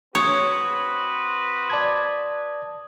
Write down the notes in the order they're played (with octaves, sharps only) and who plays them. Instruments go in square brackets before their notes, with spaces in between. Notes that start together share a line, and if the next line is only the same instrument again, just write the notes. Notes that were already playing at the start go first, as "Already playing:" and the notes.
[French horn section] C4 F#4 B4 [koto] C#5 [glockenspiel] D#6
[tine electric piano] D5 A5 G#6